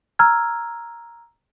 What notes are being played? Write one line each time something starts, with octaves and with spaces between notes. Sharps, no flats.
A#5 E6 F6 G#6